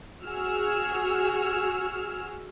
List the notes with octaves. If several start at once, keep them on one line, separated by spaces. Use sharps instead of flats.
F#4 G#4 E6 F6